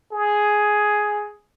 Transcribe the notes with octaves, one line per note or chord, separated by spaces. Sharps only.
G#4